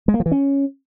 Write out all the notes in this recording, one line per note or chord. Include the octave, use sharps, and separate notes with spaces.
G#3
A#3
F3
E3
C#4